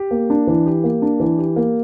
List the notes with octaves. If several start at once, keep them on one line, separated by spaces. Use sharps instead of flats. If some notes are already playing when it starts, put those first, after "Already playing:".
Already playing: G4
A#3
D4
E3
G4
A#3
D4
E3
G4
A#3